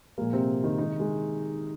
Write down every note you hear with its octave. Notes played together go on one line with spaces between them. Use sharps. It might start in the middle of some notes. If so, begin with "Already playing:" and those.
A#2 F3 G#3 A#3
C3 C4
D#3 D#4
C3 D#3 G#3 D#4
G#3 G#4